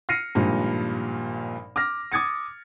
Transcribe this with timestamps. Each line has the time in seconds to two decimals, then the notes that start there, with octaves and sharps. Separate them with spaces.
0.09 F6 A#6 C7 C#7 D#7
0.35 G#1 G2 A#2 F3
1.76 D6 F6 A#6
2.12 D6 D#6 G#6 A6 C#7